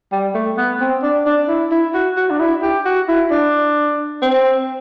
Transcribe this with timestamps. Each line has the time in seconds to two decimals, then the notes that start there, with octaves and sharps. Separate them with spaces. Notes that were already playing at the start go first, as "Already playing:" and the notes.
0.12 G3
0.34 A3
0.57 B3
0.80 C4
1.03 D4
1.26 D4
1.48 E4
1.71 E4
1.94 F#4
2.17 F#4
2.30 D4
2.39 E4
2.62 G4
2.85 F#4
3.08 E4
3.31 D4
4.22 C4